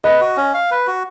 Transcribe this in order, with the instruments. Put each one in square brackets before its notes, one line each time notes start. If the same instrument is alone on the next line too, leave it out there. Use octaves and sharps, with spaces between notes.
[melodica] B4 [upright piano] D#5
[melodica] F#4
C#4
F5
B4
F#4